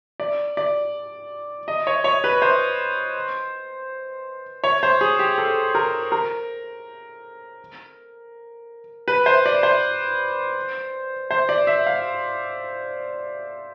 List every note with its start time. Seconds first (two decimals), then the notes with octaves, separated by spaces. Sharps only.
0.20 D5
0.57 D5
1.68 D#5
1.87 C#5
2.04 C#5
2.24 B4
2.42 C5
4.64 C#5
4.83 C5
5.01 G#4
5.19 G4
5.38 A4
5.75 A#4
6.12 A#4
9.08 B4
9.26 C5
9.46 D5
9.63 C5
11.31 C5
11.49 D5
11.67 E5
11.86 F5